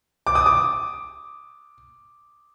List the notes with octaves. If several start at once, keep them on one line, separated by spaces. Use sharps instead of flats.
D6
D#6
D6